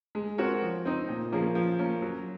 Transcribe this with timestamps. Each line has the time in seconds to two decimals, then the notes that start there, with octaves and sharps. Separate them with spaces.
0.15 G#3
0.38 C4 F#4 A#4 C#5
0.62 F3
0.85 C4 D#4
1.09 A#2
1.32 F3 A#3 C#4 G#4
1.55 F3
1.79 A#3 C#4
2.02 F#3